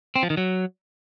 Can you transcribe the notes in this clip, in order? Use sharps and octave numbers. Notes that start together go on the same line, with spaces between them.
C4
F3
D#3
F#3